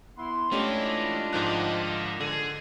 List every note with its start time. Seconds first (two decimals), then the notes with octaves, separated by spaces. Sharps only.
0.17 B3 E4 C6
0.52 E3 G#3 A3 C#4 D4 F4 G4 D#5
1.33 G#2 F3 A#4 G5 F#6
2.20 D3 G#4